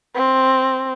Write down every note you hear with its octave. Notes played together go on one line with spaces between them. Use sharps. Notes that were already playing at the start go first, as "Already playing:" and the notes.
C4